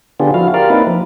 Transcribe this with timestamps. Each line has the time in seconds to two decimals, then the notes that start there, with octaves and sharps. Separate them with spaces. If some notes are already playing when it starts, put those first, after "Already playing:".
0.20 D3 B3 D4 F4 G4 G#4
0.34 F3 E4 F#4 F5
0.54 F4 G4 A#4 D5 F5
0.70 A#3 C4 D#4 E4 B4
0.87 F3